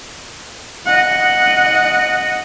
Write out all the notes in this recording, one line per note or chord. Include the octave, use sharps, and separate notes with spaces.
D#5 F#5